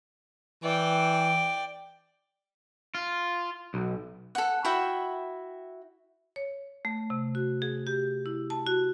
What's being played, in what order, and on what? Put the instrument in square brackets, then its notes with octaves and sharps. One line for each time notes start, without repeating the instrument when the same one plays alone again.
[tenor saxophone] E3 [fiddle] D5 G5
[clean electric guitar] F4
B1
[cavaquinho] A4 F#5
E4 F#4 E5 G5
[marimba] C#5
A3
C3
F#4
G#4
G4
E4
A5
F#4